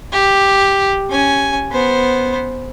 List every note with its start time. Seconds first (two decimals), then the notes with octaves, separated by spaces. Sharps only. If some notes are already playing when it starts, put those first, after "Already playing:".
0.13 G4
1.10 C#4 G#5
1.72 B3 C5